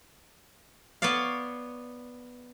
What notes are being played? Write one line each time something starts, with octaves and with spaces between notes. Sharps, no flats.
B3 B4 C#5 D5 F5